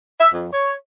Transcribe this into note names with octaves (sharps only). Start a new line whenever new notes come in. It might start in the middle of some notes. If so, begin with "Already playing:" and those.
E5
F2
C#5